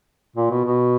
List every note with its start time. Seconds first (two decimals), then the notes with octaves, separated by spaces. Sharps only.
0.36 A#2
0.50 B2
0.65 B2